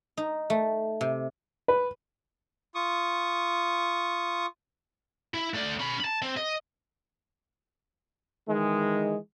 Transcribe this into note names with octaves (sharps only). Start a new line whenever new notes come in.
D#4
A3
C3
B4
F4 C#6 D#6
E4
A3 D5
C#4 B5
A5 B5
C4
D#5
D#3 E3 G#3